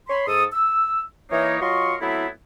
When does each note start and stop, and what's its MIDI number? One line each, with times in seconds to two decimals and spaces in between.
0.10 0.25 73
0.10 0.25 83
0.10 0.25 84
0.27 0.45 44
0.27 0.45 69
0.27 0.45 87
0.53 1.01 88
1.31 1.60 52
1.31 1.60 58
1.31 1.60 63
1.31 1.60 73
1.60 1.96 54
1.60 1.96 65
1.60 1.96 70
1.60 1.96 75
1.60 1.96 84
1.60 1.96 85
2.01 2.27 54
2.01 2.27 57
2.01 2.27 59
2.01 2.27 60
2.01 2.27 64